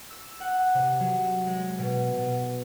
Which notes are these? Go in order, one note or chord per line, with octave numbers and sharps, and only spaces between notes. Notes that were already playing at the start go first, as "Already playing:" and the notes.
E6
F#5
C3
F#3
G#3
B2
B2